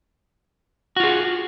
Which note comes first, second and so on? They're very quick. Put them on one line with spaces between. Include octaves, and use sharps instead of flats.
F#4 F4 G#4